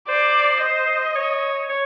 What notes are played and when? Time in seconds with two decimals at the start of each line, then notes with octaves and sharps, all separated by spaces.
0.08 C5 D5
0.62 D#5
1.16 C#5
1.70 C#5